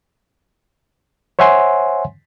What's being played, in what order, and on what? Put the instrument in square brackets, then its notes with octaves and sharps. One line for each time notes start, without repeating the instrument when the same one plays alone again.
[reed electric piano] C5 C#5 E5 F#5 G#5 C6